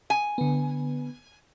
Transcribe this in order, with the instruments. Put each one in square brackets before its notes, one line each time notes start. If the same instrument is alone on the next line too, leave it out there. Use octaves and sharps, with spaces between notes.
[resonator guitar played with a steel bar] G#5
[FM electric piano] D3 B3